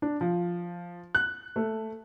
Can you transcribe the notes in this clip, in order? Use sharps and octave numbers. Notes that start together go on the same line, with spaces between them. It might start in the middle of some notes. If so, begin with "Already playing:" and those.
D4
F3
F#6
A3